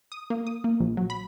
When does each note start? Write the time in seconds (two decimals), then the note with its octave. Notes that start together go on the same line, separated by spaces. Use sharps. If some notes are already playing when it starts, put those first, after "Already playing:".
0.12 D#6
0.30 A#3
0.47 D#6
0.64 A#3
0.80 A#1
0.97 F#3
1.10 B5